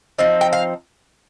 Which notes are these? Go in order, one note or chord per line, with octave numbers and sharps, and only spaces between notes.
F3 C4 D#4
G5
F5